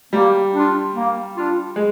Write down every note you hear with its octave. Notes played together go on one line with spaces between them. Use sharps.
G3 A#3
D4 F4
A#3
D4 F4
G#3